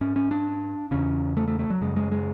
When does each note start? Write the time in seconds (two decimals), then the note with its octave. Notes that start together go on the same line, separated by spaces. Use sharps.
0.01 G#2 C#4
0.16 C#4
0.31 D4
0.91 E2 C#3 C#4
1.37 A3
1.48 A3
1.59 A3
1.70 F#3
1.81 F#2 C#3 G#3
1.96 G#3
2.12 G#3